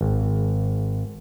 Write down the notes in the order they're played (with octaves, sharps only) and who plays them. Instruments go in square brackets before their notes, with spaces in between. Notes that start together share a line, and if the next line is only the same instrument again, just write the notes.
[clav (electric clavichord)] G#1